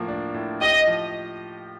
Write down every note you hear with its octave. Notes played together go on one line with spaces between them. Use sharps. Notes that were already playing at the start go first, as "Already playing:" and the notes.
Already playing: A2 F3 A#3
D4
A2
G4 D#5
F3